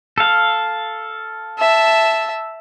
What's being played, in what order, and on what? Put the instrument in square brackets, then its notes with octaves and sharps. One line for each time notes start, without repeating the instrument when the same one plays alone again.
[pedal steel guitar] A4 F5
[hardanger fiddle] E5 A5